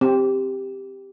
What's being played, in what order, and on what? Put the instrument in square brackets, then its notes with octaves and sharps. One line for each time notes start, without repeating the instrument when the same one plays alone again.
[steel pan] C4 [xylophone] G4